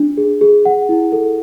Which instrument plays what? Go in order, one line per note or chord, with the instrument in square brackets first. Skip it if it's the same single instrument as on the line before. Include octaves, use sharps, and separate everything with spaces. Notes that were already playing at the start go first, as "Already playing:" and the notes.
Already playing: [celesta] D4
G#4
G#4
F#5
E4
A4